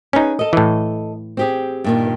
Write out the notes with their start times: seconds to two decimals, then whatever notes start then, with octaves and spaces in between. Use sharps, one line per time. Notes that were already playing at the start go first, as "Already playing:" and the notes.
0.13 C#4 D#4 G#4 B4
0.39 A4 D#5
0.53 A2 E3
1.37 C4 G4 G#4
1.84 G2 A#2 D#3